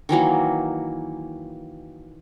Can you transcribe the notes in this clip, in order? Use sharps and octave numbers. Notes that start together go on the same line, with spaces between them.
D#3 E3 F#3 A#3